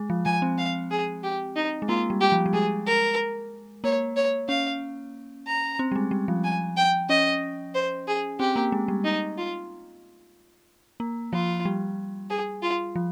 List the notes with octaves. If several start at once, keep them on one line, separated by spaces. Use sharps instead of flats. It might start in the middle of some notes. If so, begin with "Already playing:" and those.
Already playing: G#3
F3
F3 G#5
C4
F5
G#4
G4
D#4
G#3
A#3 F4
G3
G4
F3
G3
G#3 G#4
A#4
A#3 C#5
C#5
C#4 F5
A#5
C4
G3
G#3
G3
F3
G#5
G5
C#4 D#5
C5
G#4
C4 G4
A#3
G#3
G3
D#4
F4
A#3
F3 F4
G3
G#4
F4
F3